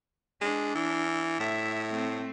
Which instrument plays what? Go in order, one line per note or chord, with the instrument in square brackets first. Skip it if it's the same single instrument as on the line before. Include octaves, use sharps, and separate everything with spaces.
[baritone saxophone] G#3 [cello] D4
[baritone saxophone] E3
[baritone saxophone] A2 [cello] E5
[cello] A3 C4